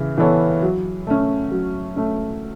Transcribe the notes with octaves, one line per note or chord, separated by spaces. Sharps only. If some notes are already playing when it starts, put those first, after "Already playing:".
Already playing: C#3 E3
E3 B3 A4 C#5
F#3
A3 C#4
F#3
A3 C#4